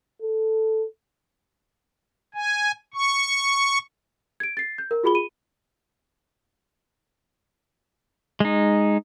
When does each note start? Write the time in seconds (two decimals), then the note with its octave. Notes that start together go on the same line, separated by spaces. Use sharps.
0.22 A4
2.34 G#5
2.94 C#6
4.40 G#6 D7
4.57 A6 C7
4.78 G6
4.91 A#4
5.04 F4 F#4 G#4 B5 G7
5.15 D#7
8.40 G#3 D#4